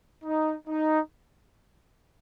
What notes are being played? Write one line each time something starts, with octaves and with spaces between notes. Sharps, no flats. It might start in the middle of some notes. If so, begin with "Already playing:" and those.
D#4
D#4